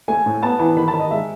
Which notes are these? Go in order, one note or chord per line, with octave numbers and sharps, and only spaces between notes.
A3 G#5
A2
B3 A5
E3 A5
D#3 B5
A5
D#3
D#5
G#3 E5